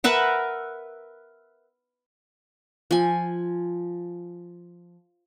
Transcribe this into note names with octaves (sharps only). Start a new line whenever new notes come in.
A#4 B4 E5 F#5
F3 G#5